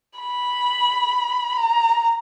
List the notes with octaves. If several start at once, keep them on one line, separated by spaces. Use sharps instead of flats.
B5
A#5